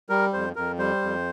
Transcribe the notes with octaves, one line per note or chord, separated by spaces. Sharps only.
G3 A#4
F2 C5
F2 A#4
G3 C5
F2